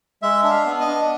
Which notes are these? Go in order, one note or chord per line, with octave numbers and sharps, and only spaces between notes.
G#3 E5
D4 E5
F5
B3
D#5
D4